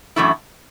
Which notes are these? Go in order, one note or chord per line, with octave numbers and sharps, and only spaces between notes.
F#2 E3 A3 E4